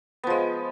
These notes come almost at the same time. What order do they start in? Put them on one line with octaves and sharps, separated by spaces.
B3 F3 G#3